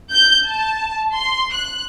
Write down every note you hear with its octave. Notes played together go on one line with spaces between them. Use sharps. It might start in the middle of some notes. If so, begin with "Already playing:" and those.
G6
A5
C6
F#6